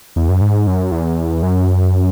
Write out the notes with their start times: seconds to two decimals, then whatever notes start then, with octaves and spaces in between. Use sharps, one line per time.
0.16 E2
0.29 F#2
0.41 G#2
0.67 F#2
0.92 E2
1.43 F#2